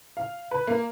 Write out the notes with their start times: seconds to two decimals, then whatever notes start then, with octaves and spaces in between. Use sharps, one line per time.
0.17 F5
0.51 B4
0.67 A#3